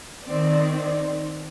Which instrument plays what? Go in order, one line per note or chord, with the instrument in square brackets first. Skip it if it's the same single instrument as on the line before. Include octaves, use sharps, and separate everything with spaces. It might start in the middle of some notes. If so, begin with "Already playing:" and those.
[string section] D#3 C4 D5